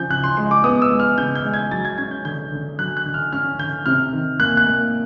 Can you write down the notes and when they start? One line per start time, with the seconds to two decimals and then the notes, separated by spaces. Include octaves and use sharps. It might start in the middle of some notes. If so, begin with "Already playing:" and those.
Already playing: C#3 F3 G6
0.10 C#3 F#6
0.24 C6
0.37 G#3 C6
0.51 D6
0.64 B3 D#6
0.82 E6
0.91 G#3
1.00 F6
1.18 C#3 G6
1.35 G6
1.44 G#3
1.54 G#6
1.71 F#3 A6
1.85 G#6
1.98 C#4 G#6
2.11 G6
2.25 D3 G6
2.52 D3
2.79 F#3 F#6
2.97 F#6
3.06 D3
3.14 F6
3.32 C#4 F6
3.59 D3 G6
3.86 C3 F6
4.13 D#3
4.40 A#3 F#6
4.57 F#6
4.67 A#3